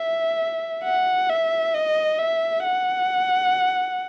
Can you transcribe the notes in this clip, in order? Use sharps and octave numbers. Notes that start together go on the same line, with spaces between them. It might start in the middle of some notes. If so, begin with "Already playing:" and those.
Already playing: E5
F#5
E5
D#5
E5
F#5